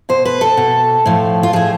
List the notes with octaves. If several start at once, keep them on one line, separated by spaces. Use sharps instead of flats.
B2 C5
B4
A4
B2
A2 F3
F4
A2 F3 G#4